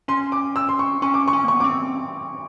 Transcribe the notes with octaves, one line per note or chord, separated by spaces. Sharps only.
C#4 C6
D6
E6
C6
C#6
C#4 C#6
D6
C#6
C#4
A#3 C#6
B3
C4 D6